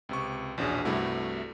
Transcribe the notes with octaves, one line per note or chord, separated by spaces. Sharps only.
C#2 C3 C#6
A#1 E2 B2 C#4 D4 G#4
C2 G2 C3 A3 E4 F#4